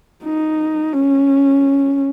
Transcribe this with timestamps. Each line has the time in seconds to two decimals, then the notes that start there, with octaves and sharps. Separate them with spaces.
0.24 D#4
0.93 C#4